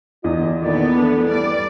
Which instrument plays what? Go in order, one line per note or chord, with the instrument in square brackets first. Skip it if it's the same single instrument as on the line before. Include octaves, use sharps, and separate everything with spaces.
[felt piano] E2 [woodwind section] G2 D3 D#5 [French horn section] F4
[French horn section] A#2 D#3 [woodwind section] D3 A3 D5 [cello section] B3
[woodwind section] E3 F3 D4 [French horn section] A3 E4 A4
[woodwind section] G3 [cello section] D5